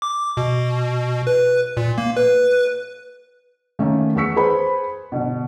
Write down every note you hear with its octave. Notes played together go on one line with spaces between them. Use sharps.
D6
B2
B4
A#2
A#3
B4
D#3 A3 A#3 C#4
E2 B3 C#6 E6 B6 C#7
G#4 B4 C5 B5
G1 B2